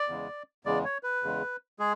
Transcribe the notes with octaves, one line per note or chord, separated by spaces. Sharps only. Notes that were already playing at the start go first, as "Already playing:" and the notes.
Already playing: D5
E2 C#3 G#3
E2 C#3 G#3 D5
C#5
B4
E2 C#3 G#3
G#3 G#4